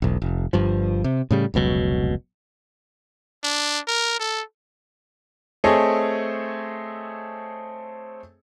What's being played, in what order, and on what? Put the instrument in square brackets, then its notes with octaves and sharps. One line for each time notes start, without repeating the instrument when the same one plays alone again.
[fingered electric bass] E1 B1
F1
G1 G2 F3
C3
A2 C#3 G3
F1 C#2 B2 F#3
[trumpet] D4
A#4
A4
[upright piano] A3 C4 G#4 A4 C#5 D#5